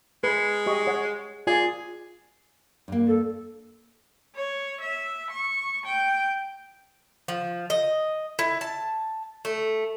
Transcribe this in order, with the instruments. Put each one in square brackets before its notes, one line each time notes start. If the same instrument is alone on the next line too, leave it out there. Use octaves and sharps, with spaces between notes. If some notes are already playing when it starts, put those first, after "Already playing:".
[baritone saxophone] G#3 [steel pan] B4
[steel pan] G4 D#5 C#6
C#5 F#5
[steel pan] F4 D5 [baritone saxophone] G#4
[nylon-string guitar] G2 A#3
[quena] A4
[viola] C#5
E5
C#6
G5
[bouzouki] F3
D#5
E4
A5
A3